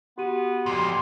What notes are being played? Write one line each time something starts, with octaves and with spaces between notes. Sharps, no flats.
B3 F#4 G4 D#7
F2 A#2 C6